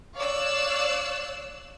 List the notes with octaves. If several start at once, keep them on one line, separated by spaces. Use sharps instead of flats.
C#5 D5 F5 E6 F#6